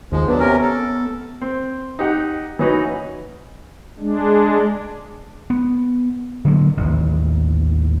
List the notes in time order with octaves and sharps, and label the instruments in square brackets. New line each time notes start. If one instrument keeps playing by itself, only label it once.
[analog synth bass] D#2 [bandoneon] F3 G#3
[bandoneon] F#3 D4 [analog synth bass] B3
[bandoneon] C3 C#4 A#4
A4
[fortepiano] C4
D#4 G4 F#5
E3 C#4 D#4 F#4 B4
[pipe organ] G#3 D4
[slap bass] B3
D3 F#3 A#3
A1 D#2